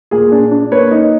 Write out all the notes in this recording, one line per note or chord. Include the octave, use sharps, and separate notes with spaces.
A#2 G#4
D4
D4
A#3 B4 C#5
D#4